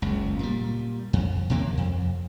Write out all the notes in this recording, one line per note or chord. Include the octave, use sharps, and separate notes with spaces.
F#1 C#2
A#2 G3
F2
D#2 C3 A#3
F2